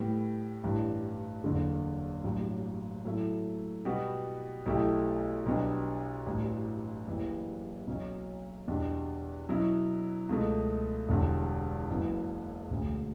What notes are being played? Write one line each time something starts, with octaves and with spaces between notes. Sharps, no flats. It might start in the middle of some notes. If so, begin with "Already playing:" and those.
Already playing: A2 G3 B3
A1 G2 E3
F#1 E2 D3
A1 G2 F#3
A2 F#3 A3 E4
B2 G3 B3 F#4
B1 B2 A3 E4 G4
B1 B2 G3 B3 D4
A1 G2 E3
F#1 F#2 E3 G3
B1 B2 F#3 C#4
E2 B2 G3 D4
B2 F#3 C#4 E4
C#2 B2 A3
E1 E2 D3 G3
F#1 F#2 E3 B3
E1 D2 C#3